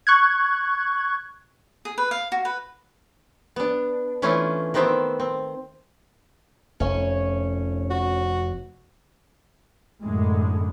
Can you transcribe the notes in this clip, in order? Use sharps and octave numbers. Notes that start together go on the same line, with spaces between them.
C#6 F#6 G#6
G#4
B4
F5
F#4
B4
B3 D4
E3 A3 C#4 D4 E4 F4
D#3 B3 C4 C5 E5
C4
F1 C#4 A4 C#5
F#4
F#2 A2 D3 G#3